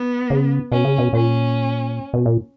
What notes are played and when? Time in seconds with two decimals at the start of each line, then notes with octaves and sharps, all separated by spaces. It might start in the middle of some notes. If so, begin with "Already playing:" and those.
Already playing: B3
0.30 C#3
0.71 B2 C#4
0.85 C#3
0.98 B2
1.13 A#2 C#4
2.14 B2
2.26 A#2